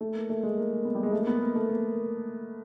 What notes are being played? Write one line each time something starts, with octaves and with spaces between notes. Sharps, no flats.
A3
A#3
A3
G#3
A#3
B3
G3
G#3
A3
A#3
B3
A#3
A3
A#3